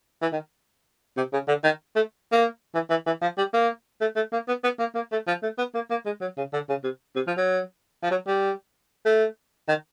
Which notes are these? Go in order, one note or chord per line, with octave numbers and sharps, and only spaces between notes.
E3
D#3
C3
C#3
D3
D#3
A3
A#3
E3
E3
E3
F3
G3
A#3
A3
A3
A#3
B3
B3
A#3
A#3
A3
F3
A3
B3
A#3
A#3
G#3
F#3
C#3
D3
C#3
C3
C3
F3
F#3
F3
F#3
G3
A3
D#3